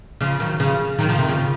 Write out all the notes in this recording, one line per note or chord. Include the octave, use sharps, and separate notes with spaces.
C#3 F3
D#3 F#3
C#3 F3
D#3 F#3
C#3 F3
C3 D#3
C#3 F3